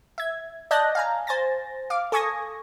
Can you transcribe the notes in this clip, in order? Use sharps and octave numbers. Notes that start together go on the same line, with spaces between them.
E5 G#6
D5 D#5 A5 F#6 G6 A#6
F5 G#5 A#5
C5 G#5 A6 A#6
F5 D6
A4 G#5 C#6 D#6 G#6 A#6